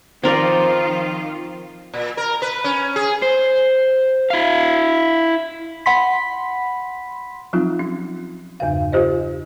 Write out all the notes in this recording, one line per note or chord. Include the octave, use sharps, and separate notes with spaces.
D#3 F3 C4 F4 A#4 D5
A#2
A#4
B4
C#4
G#4
C5
E4 F5
F#5 B5 C6 B6
F3 F#3 C4 D#4 F4
C#4
E2 G2 C#3 F5
F4 G4 C5 D#5